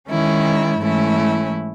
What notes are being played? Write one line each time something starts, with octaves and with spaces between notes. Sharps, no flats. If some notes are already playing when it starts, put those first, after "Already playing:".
D#3 G#3 C#4 E4
G#2 E3 A3 C#4 E4